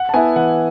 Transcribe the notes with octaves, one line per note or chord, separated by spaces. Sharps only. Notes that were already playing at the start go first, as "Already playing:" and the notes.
Already playing: F#5
A5
B3 E4 G#5
E3 F#5